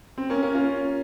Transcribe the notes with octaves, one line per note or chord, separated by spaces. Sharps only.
C4
A#3 C#4
A#3 C#4
C#4 F4